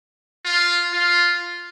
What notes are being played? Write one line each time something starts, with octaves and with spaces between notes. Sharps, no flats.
F4
F4